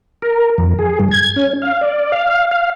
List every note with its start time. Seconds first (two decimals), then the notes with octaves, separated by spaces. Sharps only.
0.22 A#4
0.58 F2
0.79 G#4
1.00 G2
1.11 G#6
1.36 C#4
1.62 F5
1.81 D5
2.12 F5
2.51 F5